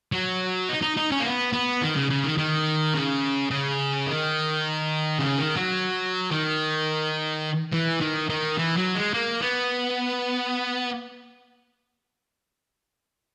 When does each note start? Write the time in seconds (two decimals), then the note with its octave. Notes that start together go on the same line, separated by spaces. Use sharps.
0.12 F#3
0.69 D#4
0.82 D#4
0.97 D#4
1.12 C#4
1.20 A#3
1.25 B3
1.53 B3
1.82 D#3
1.96 C#3
2.10 C#3
2.24 D#3
2.38 D#3
2.94 C#3
3.51 C#3
4.07 D#3
5.19 C#3
5.38 D#3
5.57 F#3
6.31 D#3
7.73 E3
8.01 D#3
8.29 D#3
8.58 E3
8.77 F#3
8.95 G#3
9.14 A#3
9.42 B3